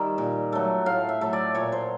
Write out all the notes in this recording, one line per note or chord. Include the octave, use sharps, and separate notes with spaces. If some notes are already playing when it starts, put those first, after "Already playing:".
Already playing: D#3 G3 E5
A#2
F#3 A3
A2 F5
E5
F#3 A3
D5
A#2 C#5
C5